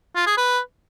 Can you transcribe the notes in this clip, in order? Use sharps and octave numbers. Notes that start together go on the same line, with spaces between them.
F4
G#4
B4